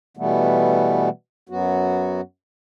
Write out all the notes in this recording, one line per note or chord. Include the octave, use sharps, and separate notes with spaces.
B2 E3 G3 A3 B3
F#2 F#3 B3 F#4